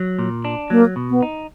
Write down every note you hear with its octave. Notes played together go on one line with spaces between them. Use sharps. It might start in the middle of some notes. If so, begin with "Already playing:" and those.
Already playing: F#3
A#2
D4
F#3 A#3
B2
B3
D#4